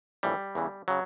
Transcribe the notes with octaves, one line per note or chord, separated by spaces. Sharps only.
A#1 A2 E3 G3
E2 C#3 E3
C#3 F#3